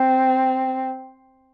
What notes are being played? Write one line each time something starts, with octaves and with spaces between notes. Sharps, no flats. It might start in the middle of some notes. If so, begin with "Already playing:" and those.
Already playing: C4